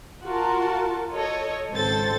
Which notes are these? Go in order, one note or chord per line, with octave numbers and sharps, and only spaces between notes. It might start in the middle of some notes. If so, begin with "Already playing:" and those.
F4 F#4 A#4 A5
A4 C#5 D#5
G#1 C#2 C4 A4 C5 A6